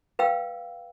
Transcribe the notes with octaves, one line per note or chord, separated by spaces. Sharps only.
B4 F5 G5 E6